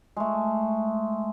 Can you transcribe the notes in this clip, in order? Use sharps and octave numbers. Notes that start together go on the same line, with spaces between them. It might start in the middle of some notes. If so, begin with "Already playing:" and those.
G#3 A3